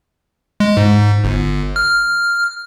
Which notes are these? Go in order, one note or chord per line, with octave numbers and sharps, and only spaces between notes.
G#3
G#2
G1
F6